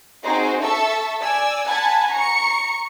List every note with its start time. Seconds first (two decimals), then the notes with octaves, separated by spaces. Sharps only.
0.24 C4 D#4 F#4 G#4 C5
0.61 A4 E5 A5 C#6 E6
1.20 D5 G#5 E6
1.66 F#5 G#5 A5 B5 G#6
2.12 A#5 C#6 C#7